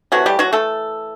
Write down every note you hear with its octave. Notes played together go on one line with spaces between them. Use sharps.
C3 E3 F#3 A3 F#4
G3 G4
F#3 F#4
A3 A4